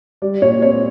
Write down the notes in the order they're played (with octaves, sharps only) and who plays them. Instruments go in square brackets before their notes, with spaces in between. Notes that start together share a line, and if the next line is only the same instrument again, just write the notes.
[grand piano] G3 D5
A#2 C#5
C4 C#5